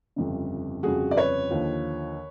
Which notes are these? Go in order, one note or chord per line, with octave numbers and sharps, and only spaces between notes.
G1 F2 C#3
G1 F2 C#3 F#4 G#4
D5
B4 C#5
D#2 D3 F3